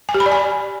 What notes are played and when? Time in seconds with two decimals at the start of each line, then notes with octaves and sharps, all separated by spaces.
0.09 G#5
0.14 G4
0.20 B5
0.26 D5
0.32 G#5